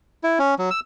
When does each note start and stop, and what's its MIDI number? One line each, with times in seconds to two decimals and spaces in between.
0.24 0.39 64
0.39 0.55 61
0.59 0.70 54
0.71 0.80 88